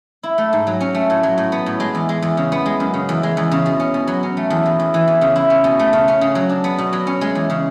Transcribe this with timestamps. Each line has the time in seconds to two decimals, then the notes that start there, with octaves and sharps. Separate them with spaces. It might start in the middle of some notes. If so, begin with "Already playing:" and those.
0.23 E4
0.38 A3
0.53 G#2
0.67 F#3
0.80 C#4
0.95 A3
1.10 A2
1.23 F#3
1.38 A2
1.52 B3
1.66 A2
1.80 G#3
1.95 E2
2.09 G#3
2.22 E2
2.37 C#3
2.52 B3
2.66 G#3
2.80 F#2
2.94 C#3
3.09 E2
3.23 G#3
3.37 E2
3.51 C#3
3.66 B2
3.80 C#4
3.94 B2
4.07 F#3
4.23 C#4
4.37 A3
4.50 E2
4.66 B2
4.80 E2
4.94 E3
5.08 E2
5.21 C#3
5.36 E4
5.50 C#4
5.64 B2
5.79 A3
5.93 C#3
6.08 C#4
6.21 C#3
6.35 F#3
6.49 D4
6.64 B3
6.78 B2
6.93 F#3
7.07 C#4
7.21 G#3
7.35 E2
7.50 C#3